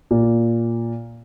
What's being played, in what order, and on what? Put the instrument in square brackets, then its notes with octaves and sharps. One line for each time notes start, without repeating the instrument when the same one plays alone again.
[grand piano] A#2